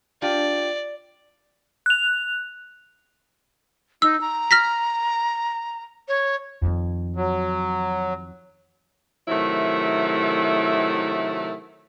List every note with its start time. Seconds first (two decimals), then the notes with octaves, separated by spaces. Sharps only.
0.22 D4 F4 G4 D5
1.86 F#6 F7
4.02 D#4 E6
4.21 A#5
4.51 F6 A#6 B6
6.08 C#5
6.62 F2 D#3
7.16 F#3
9.28 C3 D#3 F#3 A3 E4